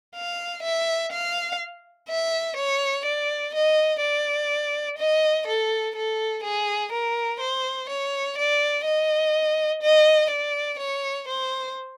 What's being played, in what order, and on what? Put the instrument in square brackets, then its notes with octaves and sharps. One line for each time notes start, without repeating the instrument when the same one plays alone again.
[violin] F5
E5
F5
E5
C#5
D5
D#5
D5
D#5
A4
A4
G#4
A#4
C5
C#5
D5
D#5
D#5
D5
C#5
C5